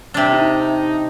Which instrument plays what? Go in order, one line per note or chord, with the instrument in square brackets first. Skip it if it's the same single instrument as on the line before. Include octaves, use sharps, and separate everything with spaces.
[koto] C3 D4
[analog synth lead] D#4